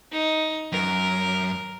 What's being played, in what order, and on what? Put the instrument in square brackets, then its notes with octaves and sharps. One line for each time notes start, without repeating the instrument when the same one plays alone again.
[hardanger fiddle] D#4
[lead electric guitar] F#2 [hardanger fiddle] A#4